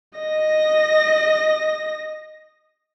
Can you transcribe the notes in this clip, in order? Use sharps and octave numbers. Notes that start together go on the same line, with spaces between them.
D#5 A#6